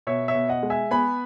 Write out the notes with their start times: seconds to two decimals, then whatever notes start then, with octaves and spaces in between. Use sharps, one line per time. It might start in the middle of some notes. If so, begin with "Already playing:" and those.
0.07 B2 C#5 E5
0.28 C#5 E5
0.35 B2
0.49 D#5 F#5
0.63 G#3
0.70 E5 G#5
0.91 B3 G#5 B5